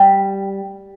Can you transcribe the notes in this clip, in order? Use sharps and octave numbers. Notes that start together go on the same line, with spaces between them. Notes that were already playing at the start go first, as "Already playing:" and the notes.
Already playing: G3